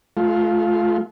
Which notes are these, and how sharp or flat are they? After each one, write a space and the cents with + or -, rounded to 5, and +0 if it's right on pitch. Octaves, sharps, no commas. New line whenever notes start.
A3 -35 F4 +0